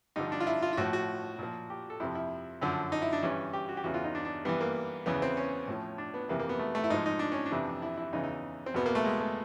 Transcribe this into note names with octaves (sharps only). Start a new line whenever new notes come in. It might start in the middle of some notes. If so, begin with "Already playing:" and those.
G2 D3 F3 D#4
D4
F4
E4
F4
F4
A2 F3 F#4
F#4
A#2 F3
G4
A4
F2 C3 F3 E4
E4
F#2 D3 F3
D#4
E4
D4
G2 E3 C#4
G4
F#4
G4
E2 C#3 E3 F#4
F4
D#4
D4
D4
G2 E3 B3
A#3
E2 C#3 E3 B3
C4
C#4
A2 F3
D4
B3
F2 C3 E3 A#3
A#3
B3
A3
A3
E4
G#2 F3 D#4
D#4
D4
C#4
D4
F2 C3 E3
E4
E4
E2 C#3 E3 D#4
D#4
C4
E2 B2 B3
A#3
A3
G#3
A3